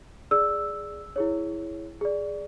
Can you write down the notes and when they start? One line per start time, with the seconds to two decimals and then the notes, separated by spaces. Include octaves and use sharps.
0.31 G#4 D5 E6
1.16 E4 G#4 C#5
2.01 G#4 D5